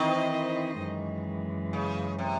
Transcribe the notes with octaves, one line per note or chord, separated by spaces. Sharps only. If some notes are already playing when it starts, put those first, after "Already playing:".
Already playing: D#3 E3 C4 E4 C5 D#5
F#2 E3 G#3
C#3
C3